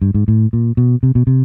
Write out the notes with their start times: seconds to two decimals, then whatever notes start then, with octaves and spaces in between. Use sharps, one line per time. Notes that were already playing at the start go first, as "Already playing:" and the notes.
0.02 G2
0.14 G#2
0.28 A2
0.53 A#2
0.77 B2
1.03 C3
1.15 B2
1.27 C3